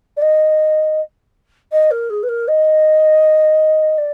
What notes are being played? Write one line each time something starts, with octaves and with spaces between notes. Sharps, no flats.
D5
D#5
D#5
A#4
G#4
B4
A#4
D#5
D5